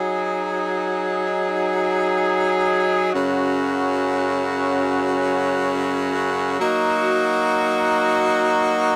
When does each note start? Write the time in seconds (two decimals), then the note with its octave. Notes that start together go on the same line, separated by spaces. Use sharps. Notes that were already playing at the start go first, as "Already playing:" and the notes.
Already playing: F#3 D#4 G#4
3.12 F#2 C#3 F#3 C#4 F#4
6.59 F#3 A#3 D#4 F#4